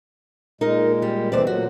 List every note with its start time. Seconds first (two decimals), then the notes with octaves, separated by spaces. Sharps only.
0.61 A#2 G#3 D#4 A#4
1.02 G3
1.32 D2 B2 E3 C4 C5 D5
1.47 A#2 F#3 F#4